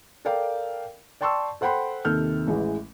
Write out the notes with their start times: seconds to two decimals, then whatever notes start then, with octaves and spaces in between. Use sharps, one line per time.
0.25 A4 A#4 D5 F5 G5
1.21 D5 G5 A5 C6 C#6 E6
1.61 A4 C5 F#5 G5 B5 C6
2.05 D#2 C3 D#3 A4 F6 G6
2.47 A1 E3 G#3